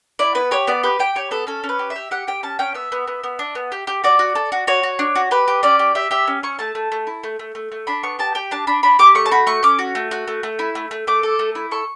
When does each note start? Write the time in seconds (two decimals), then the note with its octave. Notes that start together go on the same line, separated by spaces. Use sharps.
0.19 E4 D5
0.35 B3 B4
0.51 G4 C#5
0.67 B3 D5
0.83 G4 B4
0.99 G4 G5
1.15 G4 C#5
1.31 B3 A4
1.47 C#4 A4
1.64 C#4
1.69 B4
1.79 G4
1.90 E5
1.96 G4
2.11 G4 F#5
2.27 G4 G5
2.43 C#4 A5
2.59 C#4 G5
2.74 B3 E5
2.92 B3
3.07 B3
3.24 B3
3.39 D4
3.55 B3
3.72 G4
3.87 G4
4.04 F#4 D5
4.19 F#4
4.35 A4
4.52 F#4
4.67 F#4 C#5
4.83 F#4
4.99 D4
5.15 F#4
5.31 G4 B4
5.48 G4
5.63 C#4 D5
5.79 G4
5.95 G4 E5
6.11 G4 E5
6.27 C#4
6.43 C#4 C#6
6.59 A3 A5
6.75 A3
6.92 A3
7.07 E4
7.24 A3
7.39 A3
7.55 A3
7.72 A3
7.87 D4 B5
8.03 B3 C#6
8.19 G4 A5
8.35 G4 G5
8.51 D4 A5
8.67 D4 B5
8.83 D4 B5
8.99 G4 D6
9.15 A3 C#6
9.26 A5
9.31 F#4 B5
9.47 A3 C#6
9.63 C#4 D6
9.79 F#4
9.95 A3
10.11 F#4
10.28 A3
10.43 A3
10.59 E4
10.75 A3
10.91 A3
11.07 A3 D6
11.23 A4
11.39 A3
11.55 E4
11.71 A4 C#6